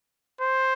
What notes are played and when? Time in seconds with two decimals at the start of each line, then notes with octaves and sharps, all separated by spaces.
0.41 C5